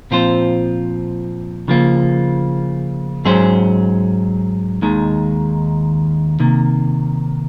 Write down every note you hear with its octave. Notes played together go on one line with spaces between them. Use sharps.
A#2 F3 C4 F4 C5
C#3 F3 A#3
G#2 F#3 C#4 G#4 C5
D#2 D#3 G#3
C3 D#3 A#3